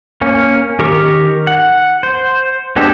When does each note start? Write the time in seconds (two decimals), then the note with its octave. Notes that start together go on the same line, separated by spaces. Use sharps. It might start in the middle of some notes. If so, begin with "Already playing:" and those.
0.21 A#3 C#4
0.79 D#3 G4 A#4 C#6
1.47 F#5
2.03 C5
2.76 G#3 B3 D4 G4 A4